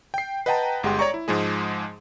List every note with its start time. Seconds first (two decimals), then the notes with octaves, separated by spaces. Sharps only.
0.14 G5 C7
0.46 B4 D#5 F#5 G5 A5 A#5
0.83 G1 G#3 G4 F#5 G5 C6
0.99 C#5 D5 A#5 C#6
1.14 E4
1.28 G#2 F3 G#3 G#4